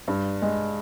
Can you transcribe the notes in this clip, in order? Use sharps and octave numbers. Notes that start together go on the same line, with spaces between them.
G2
G#3